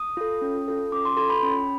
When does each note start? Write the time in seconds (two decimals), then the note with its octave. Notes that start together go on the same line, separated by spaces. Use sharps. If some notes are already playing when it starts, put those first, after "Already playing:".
Already playing: D#6
0.17 F4 A4
0.42 C#4
0.68 F4 A4
0.92 C#4 D6
1.05 C6
1.17 F4 A4 C6
1.30 B5
1.43 C#4